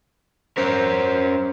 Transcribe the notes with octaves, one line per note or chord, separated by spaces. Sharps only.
C#4 A#4 C5